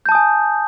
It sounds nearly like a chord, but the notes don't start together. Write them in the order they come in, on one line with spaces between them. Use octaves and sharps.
G6 A5 D#6 G#5